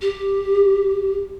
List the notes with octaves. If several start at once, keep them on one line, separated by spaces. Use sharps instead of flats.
G4